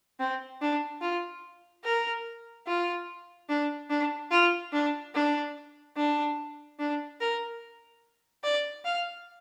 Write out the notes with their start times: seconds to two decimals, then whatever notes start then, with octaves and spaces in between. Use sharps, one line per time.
0.20 C4
0.61 D4
1.02 F4
1.84 A#4
2.67 F4
3.49 D4
3.90 D4
4.31 F4
4.73 D4
5.14 D4
5.96 D4
6.79 D4
7.20 A#4
8.44 D5
8.85 F5